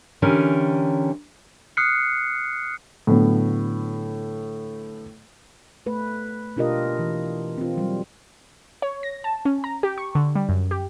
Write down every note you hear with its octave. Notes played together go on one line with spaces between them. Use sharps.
D3 E3 C#4 G4 A#4
D#6 F6 F#6 C7 C#7
A2 D3 F#3 B3
A3 B4
B2 D4 F4 G4 A#4 D#5
E3
C4 F4
F#3 G3
C#5
A#6
A5
C#4
A#5
G4
C#6
D3
G3
F#2
G4